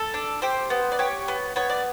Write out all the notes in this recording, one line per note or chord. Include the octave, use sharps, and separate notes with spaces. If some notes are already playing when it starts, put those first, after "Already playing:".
Already playing: A4
D4
G4 C5
B3
D5
G4 C#5
B3
B3 C#5
D5